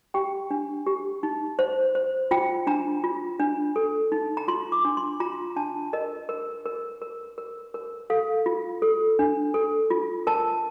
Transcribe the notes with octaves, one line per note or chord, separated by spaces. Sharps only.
G4 G5
D4
G4
D#4
C5
C5
F4 G5
D4 A#5
F4
D4
A4
D#4
A#5
F4 C6
D6
D4
C6
F4 A#5
D4 A5
A#4 D#5
A#4
A#4
A#4
A#4
A#4
A4 F5
F4
A4
D4
A4
F4
A#4 A5